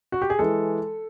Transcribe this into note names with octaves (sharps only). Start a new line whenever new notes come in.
F#4
G4
G#4
E3 G#3 A4